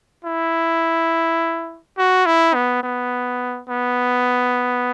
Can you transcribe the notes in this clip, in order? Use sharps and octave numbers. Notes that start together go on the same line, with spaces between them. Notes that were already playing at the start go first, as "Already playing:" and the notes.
E4
F#4
E4
B3
B3
B3